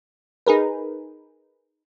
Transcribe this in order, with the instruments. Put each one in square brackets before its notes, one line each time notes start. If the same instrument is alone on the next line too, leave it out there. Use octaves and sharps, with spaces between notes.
[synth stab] D#4 G#4 A#4 B4